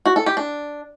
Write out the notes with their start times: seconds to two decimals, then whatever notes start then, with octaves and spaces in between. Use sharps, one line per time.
0.05 F#4
0.16 A4
0.26 G4
0.37 D4